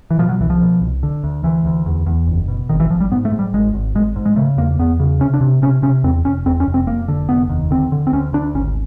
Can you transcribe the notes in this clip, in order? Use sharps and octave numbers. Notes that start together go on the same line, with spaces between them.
E3
B2 F3
F#3
C2 E3
F3
B2
C2
D3
D2
D2 E3
D2
E2
E2
F#1
B2
G#1 D#3
E3
G#1 F3
G3
G#2 B3
A3
G#2
G3
G#1 G#3
G#1
G#1 G#3
G#2
G#3
C#3 A3
E2 A#3
E2 B3
C#3
C3 C#4
D4
C3
C3 C#4
C3 C#4
E2 C4
F1 C#4
E2 C4
C#4
F1
C4
F1 A#3
D3
F1 B3
D#2
D3 C4
D3
C4
D2 C#4
D2 D4
G#1 C#4